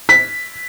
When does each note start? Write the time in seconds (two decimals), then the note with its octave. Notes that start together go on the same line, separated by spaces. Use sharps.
0.09 B6